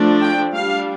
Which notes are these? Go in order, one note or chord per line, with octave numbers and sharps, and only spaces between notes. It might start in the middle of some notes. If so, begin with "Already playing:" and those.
Already playing: F3 A3 D4
G5
G3 D4 F5